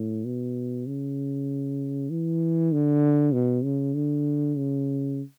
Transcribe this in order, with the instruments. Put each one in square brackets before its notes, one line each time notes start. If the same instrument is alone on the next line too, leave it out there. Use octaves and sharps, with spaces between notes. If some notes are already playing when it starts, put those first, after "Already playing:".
Already playing: [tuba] A2
B2
C#3
E3
D3
B2
C#3
D3
C#3